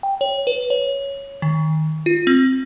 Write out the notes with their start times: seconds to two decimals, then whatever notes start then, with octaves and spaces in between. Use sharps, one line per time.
0.03 G5
0.21 C#5
0.47 B4
0.70 C#5
1.42 D#3
2.06 F4
2.27 C4